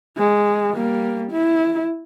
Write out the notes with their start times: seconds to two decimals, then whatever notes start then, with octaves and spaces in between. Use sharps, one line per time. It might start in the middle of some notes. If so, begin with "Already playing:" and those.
0.17 G#3
0.74 G3 A#3
1.31 E4